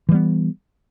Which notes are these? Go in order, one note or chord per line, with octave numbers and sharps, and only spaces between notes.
E3 G3 B3